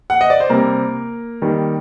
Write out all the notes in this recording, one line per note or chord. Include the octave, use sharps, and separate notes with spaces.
F#5
D#5
D5
C5
C3 G3 A#3 C4 A#4
D#3 G3 A#3